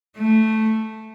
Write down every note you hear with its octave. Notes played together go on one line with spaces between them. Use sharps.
A3